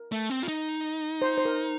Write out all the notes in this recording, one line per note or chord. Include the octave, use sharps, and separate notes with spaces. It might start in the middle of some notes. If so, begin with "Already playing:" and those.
Already playing: A#4
A3
C4
F4
D#4
C5
C5
A#4